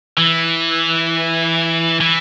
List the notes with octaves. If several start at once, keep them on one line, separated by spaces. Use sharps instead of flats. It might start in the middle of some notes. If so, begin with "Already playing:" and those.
E3
E3